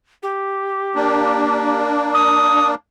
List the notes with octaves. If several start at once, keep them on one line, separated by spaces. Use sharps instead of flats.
G4
A#3 D4
D#6